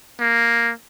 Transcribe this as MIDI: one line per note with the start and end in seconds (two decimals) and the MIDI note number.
0.20 0.72 58